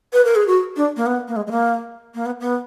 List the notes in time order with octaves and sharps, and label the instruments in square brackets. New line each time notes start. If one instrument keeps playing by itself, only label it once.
[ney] B4
A#4
G#4
F#4
D4
A#3
B3
A#3
G#3
G#3
A#3
A#3
B3
B3